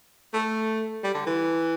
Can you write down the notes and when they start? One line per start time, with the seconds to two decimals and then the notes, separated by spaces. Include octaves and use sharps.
0.33 A3
1.03 G3
1.15 D3
1.26 E3